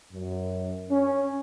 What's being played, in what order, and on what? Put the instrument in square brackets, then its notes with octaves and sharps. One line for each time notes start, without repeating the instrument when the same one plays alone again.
[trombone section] F#2
C#4